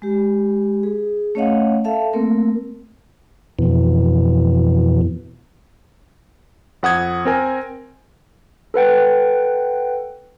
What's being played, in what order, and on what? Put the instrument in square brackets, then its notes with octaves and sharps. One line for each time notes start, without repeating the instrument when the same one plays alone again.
[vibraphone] G#3 G4
G#4
A3 C#4 C#5 D#5 F5 F#5
A4 E5 F5 A5
A3 A#3 C4 A#4
[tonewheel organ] F2 B2 E3
[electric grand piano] F2 F#5 D#6 G#6
C4 A#4 G#5
[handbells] A4 B4 F#5 G5